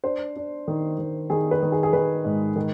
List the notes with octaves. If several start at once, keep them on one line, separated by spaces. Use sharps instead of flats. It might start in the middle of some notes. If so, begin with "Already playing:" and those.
D4 C5
D4
D#3
D#3
D#3 G#4
B4
D#3
G#4
G#4
D#3 B4
G#2
D#3